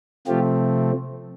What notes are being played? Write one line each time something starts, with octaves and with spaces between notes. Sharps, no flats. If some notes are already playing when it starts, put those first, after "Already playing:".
C3 F3 A3 C4 F4 G4